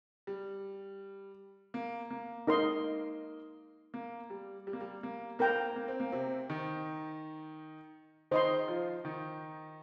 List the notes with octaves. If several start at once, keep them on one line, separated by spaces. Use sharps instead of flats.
G3
A#3
A#3
D#4 A#4 D#5 C6
A#3
G3
G3
A#3
G3
A#3
A#3 A#4 G5 A#5
A#3
C4
A#3
C3 C4
D#3 D#4
D#3 D#4 C5 D#5 C6
F3 F4
D#3 D#4